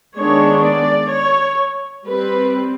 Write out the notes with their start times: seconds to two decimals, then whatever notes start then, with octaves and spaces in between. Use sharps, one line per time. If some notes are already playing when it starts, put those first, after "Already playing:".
0.18 D#3 G#3 B3 D4 C#5
0.66 D5
1.13 C#5
2.06 G3 C4 B4